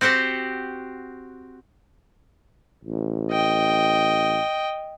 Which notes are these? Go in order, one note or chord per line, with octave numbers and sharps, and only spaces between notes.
C4 F#4 G4 C5 F#5
A1
D#5 G5